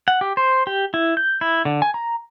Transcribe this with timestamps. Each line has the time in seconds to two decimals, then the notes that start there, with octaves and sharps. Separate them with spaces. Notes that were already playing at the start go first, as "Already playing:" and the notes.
0.08 F#5
0.21 G4
0.37 C5
0.67 G4
0.94 E4
1.17 G6
1.41 E4
1.65 D3
1.82 G#5
1.94 A#5